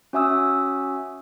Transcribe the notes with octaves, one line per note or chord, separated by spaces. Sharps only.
C#4 F#4 E5 G#5 D#6 E6